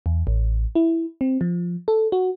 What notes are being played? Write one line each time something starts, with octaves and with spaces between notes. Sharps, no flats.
E2
A1
E4
C4
F3
A4
F#4